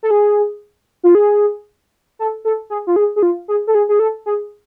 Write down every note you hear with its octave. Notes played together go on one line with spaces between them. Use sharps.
A4
G#4
F4
G#4
A4
A4
G#4
F4
G#4
G#4
F4
G#4
A4
G#4
G#4
A4
G#4